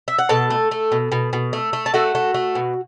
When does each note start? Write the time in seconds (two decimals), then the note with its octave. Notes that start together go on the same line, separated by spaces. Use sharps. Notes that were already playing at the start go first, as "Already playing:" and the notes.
0.08 E5
0.18 F#5
0.29 B2 A4 A5
0.50 A3
0.71 A3
0.92 B2
1.12 B2
1.33 B2
1.53 A3
1.73 A3
1.86 A5
1.94 A3 F#4 F#5
2.15 A3
2.34 A3
2.55 B2